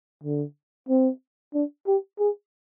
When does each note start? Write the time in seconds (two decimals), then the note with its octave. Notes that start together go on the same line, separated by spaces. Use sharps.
0.23 D3
0.89 C4
1.54 D4
1.87 G4
2.19 G#4